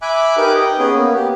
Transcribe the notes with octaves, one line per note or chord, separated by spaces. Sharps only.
E5 G#5 B5 D6 F#6
D#4 G4 A#4 B4 D6 F#6
D#5 G5
B3 C#4 G#4
A#3 B3
G4